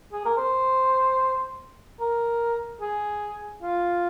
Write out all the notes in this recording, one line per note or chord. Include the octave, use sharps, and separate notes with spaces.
G#4
A#4
C5
A#4
G#4
F4